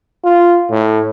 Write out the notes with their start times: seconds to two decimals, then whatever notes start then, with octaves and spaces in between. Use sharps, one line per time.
0.25 F4
0.70 A2